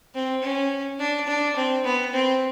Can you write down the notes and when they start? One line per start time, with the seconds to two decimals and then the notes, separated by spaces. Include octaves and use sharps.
0.14 C4
0.42 C#4
0.99 D4
1.27 D4
1.55 C4
1.84 B3
2.12 C4